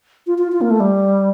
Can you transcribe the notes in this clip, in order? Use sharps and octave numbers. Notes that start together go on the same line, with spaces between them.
F4
F4
F4
A#3
A3
G3